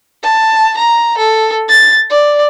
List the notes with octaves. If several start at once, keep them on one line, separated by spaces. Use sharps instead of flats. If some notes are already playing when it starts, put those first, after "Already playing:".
A5
A#5
A4
A6
D5